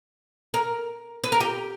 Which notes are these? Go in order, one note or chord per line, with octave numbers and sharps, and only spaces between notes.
A#4
B4
A#4
G4